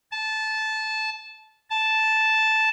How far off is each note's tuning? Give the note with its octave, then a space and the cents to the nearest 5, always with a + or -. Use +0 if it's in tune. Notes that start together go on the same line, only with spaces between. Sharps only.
A5 -15
A5 -5